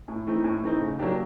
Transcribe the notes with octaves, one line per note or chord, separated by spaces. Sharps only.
A2
E3 A3 C4 D#4
A2
E3 A3 C4 D#4
C#3
F#3 A#3 D4 G4